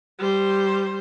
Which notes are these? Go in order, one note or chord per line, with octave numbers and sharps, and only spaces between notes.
G3 C5